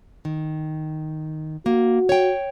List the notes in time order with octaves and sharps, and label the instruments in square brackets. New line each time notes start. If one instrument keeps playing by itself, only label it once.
[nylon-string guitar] D#3
[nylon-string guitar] A#3 [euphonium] F#4
[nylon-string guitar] C#5 G5